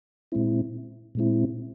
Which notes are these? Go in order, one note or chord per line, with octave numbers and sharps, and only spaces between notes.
A#2 G#3 C4 E4
A#2 G#3 C4 E4